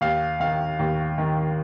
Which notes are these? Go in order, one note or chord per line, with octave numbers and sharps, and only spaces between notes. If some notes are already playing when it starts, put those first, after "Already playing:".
D#2 F5
D#3 F5
D#2
D#3